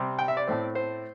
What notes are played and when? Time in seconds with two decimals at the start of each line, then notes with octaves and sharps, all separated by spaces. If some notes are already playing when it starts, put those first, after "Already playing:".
Already playing: C3 G3 C4
0.19 G5
0.28 E5
0.37 D5
0.47 A2 A3 C4
0.75 C5